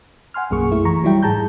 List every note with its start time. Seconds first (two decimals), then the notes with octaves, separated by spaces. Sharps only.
0.34 F#5 G#5 C6 F6
0.50 B1 F#2 A#3 G#4 C#6
0.72 A3 E4
0.85 E3 A#5 C#6
1.04 F#3 G3 E4 G5
1.23 G#2 G#4 A5 A#5 G6